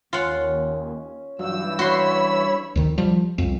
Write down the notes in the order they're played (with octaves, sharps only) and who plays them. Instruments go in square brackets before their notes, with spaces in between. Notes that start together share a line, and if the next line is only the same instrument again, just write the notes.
[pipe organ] D#2 [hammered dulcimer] C#4 [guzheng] F4 F#5
[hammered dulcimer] G2 G4 [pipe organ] E3 E6 [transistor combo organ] F#3
[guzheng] F#4 C6 [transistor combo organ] C#5 B5
[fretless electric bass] D2 D#3
F3 G3
C2 F2